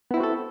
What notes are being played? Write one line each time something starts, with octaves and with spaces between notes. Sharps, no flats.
B3 C4 E4 F#4 A4